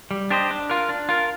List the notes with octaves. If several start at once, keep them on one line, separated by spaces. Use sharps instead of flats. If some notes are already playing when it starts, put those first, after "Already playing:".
G3
D4 G4 C5 D#5
D4
F4 A#4
D4
F4 A#4